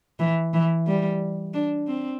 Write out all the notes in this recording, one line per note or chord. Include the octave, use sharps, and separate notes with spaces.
E3
E3
G3
D4
C4